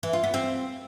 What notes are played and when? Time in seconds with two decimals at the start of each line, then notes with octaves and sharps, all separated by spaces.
0.03 E3
0.13 F4
0.24 B3
0.34 C4